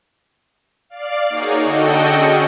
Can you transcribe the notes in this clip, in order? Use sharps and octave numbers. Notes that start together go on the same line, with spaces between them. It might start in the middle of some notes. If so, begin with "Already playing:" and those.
D5 F5
A#3 D#4 F#4 G#4 C#5
D3 F#4 A4 D#5 G5 C#7
C#4 G#4